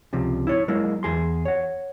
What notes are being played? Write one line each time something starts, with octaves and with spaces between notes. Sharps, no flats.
C#2 C3 F3
E4 C#5
F#3 G#3 A#3 E4
E2 G#4 C6
C#5 F#5